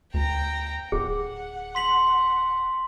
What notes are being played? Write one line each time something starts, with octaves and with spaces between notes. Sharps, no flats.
D2 G5 A#5
D1 G#4 F#5
C6 B6 F#7